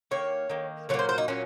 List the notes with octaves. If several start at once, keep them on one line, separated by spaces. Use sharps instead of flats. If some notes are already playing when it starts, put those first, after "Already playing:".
D#3 A#3 C#5
D#3 A#3
A#2 F#3 A#3 C#5
C5
C5
D#4
A#2 F#3 A#3 C#4